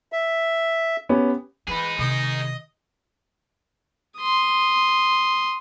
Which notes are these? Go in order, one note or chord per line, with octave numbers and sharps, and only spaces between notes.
E5
B3 C#4 G4
E3 D#4 G#4 B4
C3 D#3 D#5
C6 D#6